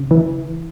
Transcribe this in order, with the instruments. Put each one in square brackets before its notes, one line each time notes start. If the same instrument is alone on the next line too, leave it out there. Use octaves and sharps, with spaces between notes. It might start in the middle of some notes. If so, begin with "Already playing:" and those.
Already playing: [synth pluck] C#3
E3